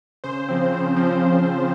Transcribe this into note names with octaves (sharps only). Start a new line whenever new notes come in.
C#3 C5
F3 C4
C#3
F3 C4